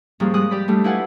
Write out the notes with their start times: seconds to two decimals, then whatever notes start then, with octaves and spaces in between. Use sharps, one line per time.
0.20 G#2 F3 G3 A#3 C#4
0.34 G3 G#3 D#6 F#6
0.51 G4 D5 B5
0.68 G3 A3 D4
0.84 E4 F4 B4 F#5 G#5